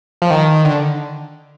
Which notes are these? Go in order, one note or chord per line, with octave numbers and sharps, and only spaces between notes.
F3
D#3
D3